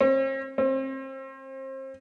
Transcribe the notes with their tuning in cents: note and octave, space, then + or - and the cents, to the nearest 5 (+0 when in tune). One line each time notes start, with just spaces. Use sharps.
C4 +45
C4 +35